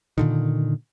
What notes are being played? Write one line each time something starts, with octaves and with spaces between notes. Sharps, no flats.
A#2 D3 D#3